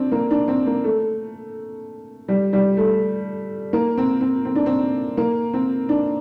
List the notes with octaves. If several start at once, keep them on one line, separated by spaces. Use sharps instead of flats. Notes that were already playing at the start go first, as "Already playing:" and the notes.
Already playing: C4 D4
A#3
D4
C4
A#3
A3
G3
G3
A3
A#3
C4
C4
C4
D4
C4
A#3
C4
D4